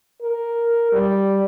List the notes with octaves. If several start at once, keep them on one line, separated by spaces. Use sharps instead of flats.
A#4
G3